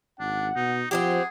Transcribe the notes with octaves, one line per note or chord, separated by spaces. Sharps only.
G#1 D4 F#5
B2 D#4
F3 C4 D#4 G4 G#4 F#5